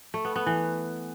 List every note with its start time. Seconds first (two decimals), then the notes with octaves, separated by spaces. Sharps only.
0.14 A3
0.25 B3
0.36 B3
0.46 E3